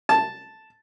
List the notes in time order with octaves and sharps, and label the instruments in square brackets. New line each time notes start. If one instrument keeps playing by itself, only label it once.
[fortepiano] A5